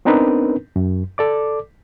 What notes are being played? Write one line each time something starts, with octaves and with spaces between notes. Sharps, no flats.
B3 C4 D4 D#4 A#4 B4
F#2
A4 D5 D6